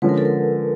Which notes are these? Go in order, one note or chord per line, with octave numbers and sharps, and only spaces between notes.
D3 F3 G#3 C#4 B4
A#4
A4
A#4